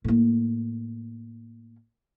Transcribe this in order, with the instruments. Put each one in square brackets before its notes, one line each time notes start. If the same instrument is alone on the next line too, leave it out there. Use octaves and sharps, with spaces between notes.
[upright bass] A2 A#3